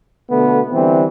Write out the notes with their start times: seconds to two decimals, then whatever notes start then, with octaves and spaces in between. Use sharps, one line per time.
0.29 B2 D3 A3 B3
0.73 D3 E3 G3 C4